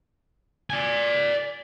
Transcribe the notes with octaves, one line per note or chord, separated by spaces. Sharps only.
D5 G#5